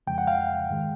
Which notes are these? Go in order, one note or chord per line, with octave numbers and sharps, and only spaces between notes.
F2 C#3 F3 G#3 G5
F#5
F5 G5
G#2 D#3 G#3